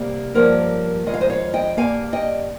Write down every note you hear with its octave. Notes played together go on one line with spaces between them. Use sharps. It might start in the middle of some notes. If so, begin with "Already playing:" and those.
Already playing: C3 G3 A#3
G2 F3 A#3 A#4 C#5
F2 D#3 G#3 D#5
F5
C5 D#5
C#5 F5
D#5 G5
G2 G3 A#3 F5 G#5
D#5 G5